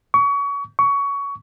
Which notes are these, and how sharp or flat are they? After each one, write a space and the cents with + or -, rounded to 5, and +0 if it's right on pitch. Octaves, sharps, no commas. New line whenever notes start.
C#6 +30
C#6 +20